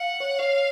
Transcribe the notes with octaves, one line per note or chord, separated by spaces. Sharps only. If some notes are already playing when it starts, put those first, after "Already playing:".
Already playing: F5 F#5
C#5
C#5 F5